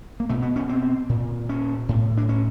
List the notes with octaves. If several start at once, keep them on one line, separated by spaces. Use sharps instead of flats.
A#3
B2 A3
B3
C#4
C4
A#2
C#4
A2
D4
C#4